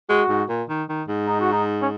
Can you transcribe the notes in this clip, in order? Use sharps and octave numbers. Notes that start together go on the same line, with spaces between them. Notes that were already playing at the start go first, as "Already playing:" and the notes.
G#3 F#4
G#2
A#2
D#3
D#3
G#2
D#4
F#4
D#4
C#4